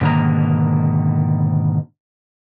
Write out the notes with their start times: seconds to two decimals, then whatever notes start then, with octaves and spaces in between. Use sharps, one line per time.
0.01 G#2 B2 D3 D#3 A#3 A#5